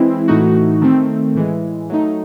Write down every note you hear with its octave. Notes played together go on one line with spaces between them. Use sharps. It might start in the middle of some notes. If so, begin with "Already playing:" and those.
Already playing: E3 G#3 C4 E4
A2 E3 A3 D#4 F#4
D#3 A3 C4
A2 E3 G#3
F#3 A3 D#4